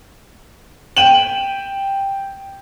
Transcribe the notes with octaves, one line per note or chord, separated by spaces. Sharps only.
G5 D#7 E7 F#7